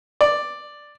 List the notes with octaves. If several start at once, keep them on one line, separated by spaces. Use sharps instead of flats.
D5